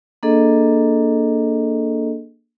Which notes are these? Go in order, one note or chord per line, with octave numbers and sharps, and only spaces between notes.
A#3 D4 G#4 A4 D#5